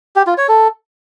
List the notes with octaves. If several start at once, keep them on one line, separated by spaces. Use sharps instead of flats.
G4
F4
C#5
A4